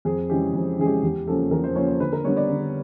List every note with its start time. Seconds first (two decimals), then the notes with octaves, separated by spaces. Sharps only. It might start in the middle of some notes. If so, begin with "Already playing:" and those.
0.05 F2 G#4
0.29 C#3 E3 G#3 C#4 G4
0.54 F2
0.78 C#3 E3 G#3 C#4 G#4
0.86 G4
1.03 E2 G4
1.27 C#3 F3 A#3 C#4 A4
1.51 E2 A#4
1.64 C5
1.76 C#3 F3 A#3 C#4 C#5
1.88 C5
2.00 D3 B4
2.13 A#4
2.25 G3 B3 D4 C#5
2.37 D5
2.49 D3